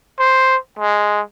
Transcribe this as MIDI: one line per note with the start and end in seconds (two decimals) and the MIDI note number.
0.19 0.56 72
0.79 1.21 56